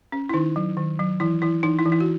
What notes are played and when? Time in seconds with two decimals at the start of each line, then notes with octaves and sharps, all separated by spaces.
0.12 C#4
0.29 E4
0.34 D#3 D#4
0.56 F#3
0.77 D#3
0.99 F#3
1.20 E3 E4
1.42 E3 E4
1.63 E3 D#4
1.79 E4
1.85 E3
1.92 E4
2.00 F#4